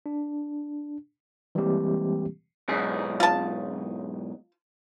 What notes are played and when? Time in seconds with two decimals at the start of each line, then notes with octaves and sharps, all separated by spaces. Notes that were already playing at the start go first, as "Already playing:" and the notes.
0.06 D4
1.55 E3 G3 G#3 A#3 C4 G4
2.68 B1 G#2 G#4
3.20 F4 A5